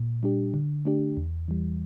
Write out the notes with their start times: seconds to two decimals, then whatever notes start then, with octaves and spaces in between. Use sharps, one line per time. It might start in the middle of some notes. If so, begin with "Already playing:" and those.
Already playing: A#2
0.23 G3 D4 G4
0.54 D3
0.85 A3 D4 G4
1.17 E2
1.48 E3 G3